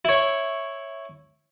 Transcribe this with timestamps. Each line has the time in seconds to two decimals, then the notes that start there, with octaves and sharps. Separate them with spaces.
0.05 E4 C#5